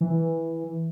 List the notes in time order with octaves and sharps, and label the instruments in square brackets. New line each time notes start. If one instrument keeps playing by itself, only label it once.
[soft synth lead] E3